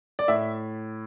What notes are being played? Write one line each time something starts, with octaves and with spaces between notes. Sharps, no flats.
D5
A2 E5